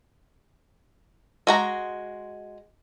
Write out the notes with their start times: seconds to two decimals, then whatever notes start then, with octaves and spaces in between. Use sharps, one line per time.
1.47 G#3 F#4 A#5